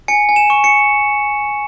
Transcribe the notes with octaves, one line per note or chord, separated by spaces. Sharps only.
G#5 C#7
G#5
E7
C#6
C#7